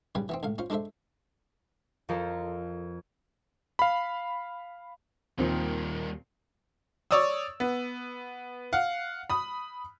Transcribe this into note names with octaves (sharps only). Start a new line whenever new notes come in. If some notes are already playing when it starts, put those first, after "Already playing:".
B1 C#3 G3 B4 G#5
E3 B3 C4
C#2 A2 F5
C#4 F4 C5
G#3 D4 A4 C5 E5
F2 F3 A4 A#4 C5
F5 B5
D#2 A#2 D#3 F3 G3 A#3 C4
C#5 D5 C#6 D#6 E6
B3
F5 F#5
B5 D#6